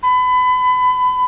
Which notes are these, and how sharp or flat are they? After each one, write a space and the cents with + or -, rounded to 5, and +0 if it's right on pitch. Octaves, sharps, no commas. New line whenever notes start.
B5 +30